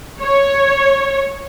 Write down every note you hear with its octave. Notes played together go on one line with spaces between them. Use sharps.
C#5